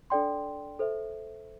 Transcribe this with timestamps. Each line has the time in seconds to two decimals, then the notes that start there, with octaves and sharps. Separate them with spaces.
0.10 D4 A4 D5 G5 C6
0.79 A4 C5 E5